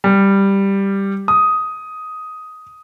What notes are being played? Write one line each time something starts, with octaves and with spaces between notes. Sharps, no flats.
G3
D#6